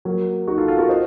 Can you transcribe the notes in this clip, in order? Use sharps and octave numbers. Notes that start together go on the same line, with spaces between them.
F#3 A#3
D#4 F#4
F4 A4
F4 A4
F#4 A#4
C5 D#5